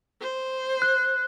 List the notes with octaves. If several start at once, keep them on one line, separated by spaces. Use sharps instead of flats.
C5
F#6